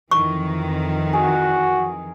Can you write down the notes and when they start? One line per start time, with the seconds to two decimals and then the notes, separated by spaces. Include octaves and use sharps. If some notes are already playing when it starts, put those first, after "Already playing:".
0.11 F2 D#3 E3 C#6
1.13 F#4 G#4